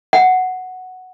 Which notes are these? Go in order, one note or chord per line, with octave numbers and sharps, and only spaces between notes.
F#5